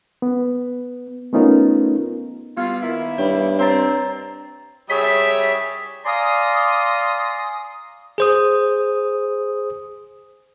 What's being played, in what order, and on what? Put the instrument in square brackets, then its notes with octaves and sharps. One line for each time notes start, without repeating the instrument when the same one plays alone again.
[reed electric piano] B3
A3 B3 C#4 D#4 F4 A#4
[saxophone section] G3 F4 [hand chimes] B3
[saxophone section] D#3 A#3 E4
[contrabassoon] G2 [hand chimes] C#5
[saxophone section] C4 [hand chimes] C#5 A#5 A6
[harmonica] G3 E5 [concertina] G#4 C#5 [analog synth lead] B6
[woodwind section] D5 F5 G#5 A#5 C6 D#6
[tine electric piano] G#4 C5 D#6